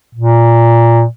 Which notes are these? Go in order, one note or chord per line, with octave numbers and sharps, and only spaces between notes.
A#2